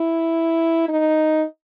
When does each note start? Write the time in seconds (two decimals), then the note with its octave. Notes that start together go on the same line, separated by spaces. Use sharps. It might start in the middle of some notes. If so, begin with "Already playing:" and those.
Already playing: E4
0.88 D#4